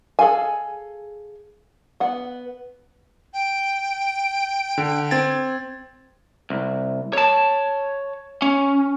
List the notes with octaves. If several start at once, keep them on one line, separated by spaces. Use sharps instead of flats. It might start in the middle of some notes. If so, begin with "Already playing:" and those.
G#4 A4 F5 G#5
B3 F#5
G5
D3
C4 G#6 A6
C2
C#5 A5
C#4